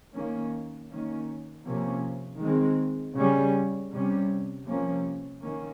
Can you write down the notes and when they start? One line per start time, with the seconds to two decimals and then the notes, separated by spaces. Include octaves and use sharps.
0.14 D#3 A#3 C#4
0.90 D#3 A#3 C#4
1.65 C3 F3 A#3 C#4
2.41 D#3 G#3 C4
3.16 C#3 G3 C#4
3.92 C3 G3 C#4
4.66 C3 F3 A#3 C#4
5.42 D#3 A#3 C#4